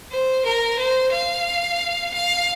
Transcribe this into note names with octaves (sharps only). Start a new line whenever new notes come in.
C5
A#4
C5
F5
F5